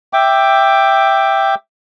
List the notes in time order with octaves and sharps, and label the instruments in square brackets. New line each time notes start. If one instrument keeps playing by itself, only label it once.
[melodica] E5 G5 D6